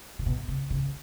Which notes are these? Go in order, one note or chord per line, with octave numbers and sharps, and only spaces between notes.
C#3
B2
C#3
C#3